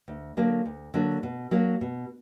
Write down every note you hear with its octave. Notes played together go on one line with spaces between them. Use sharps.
D2
D3 F#3 A#3 D4
D2
D3 F#3 A#3 D4
B2
F#3 A#3 D4
B2